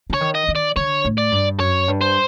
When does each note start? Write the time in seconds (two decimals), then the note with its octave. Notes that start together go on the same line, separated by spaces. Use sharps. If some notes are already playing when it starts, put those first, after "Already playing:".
0.10 D3 C#5
0.21 D#3
0.35 D#5
0.48 D#3
0.56 D5
0.76 D3 C#5
1.05 A2
1.18 D5
1.31 G2
1.59 F#2 C#5
1.88 G2
2.01 C5